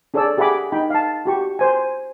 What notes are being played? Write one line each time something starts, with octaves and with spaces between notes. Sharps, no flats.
D4 G#4 A4 C#5 D5 E6
G4 G#4 E5 F#5 B5 D6
D#4 G5 B5
F5 A5
F#4 G4 C#6
C5 G#5